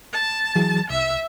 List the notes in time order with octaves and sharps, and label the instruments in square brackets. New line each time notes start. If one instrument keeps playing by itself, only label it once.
[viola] A5
[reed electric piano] E3 F#3 G#4
[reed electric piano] C2 [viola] E5